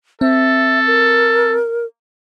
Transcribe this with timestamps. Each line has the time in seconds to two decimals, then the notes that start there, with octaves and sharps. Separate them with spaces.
0.21 C4 A4 E5
0.86 A#4